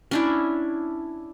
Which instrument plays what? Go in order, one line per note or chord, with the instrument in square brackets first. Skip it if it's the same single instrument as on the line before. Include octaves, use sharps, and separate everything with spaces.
[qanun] C#4 D4 E4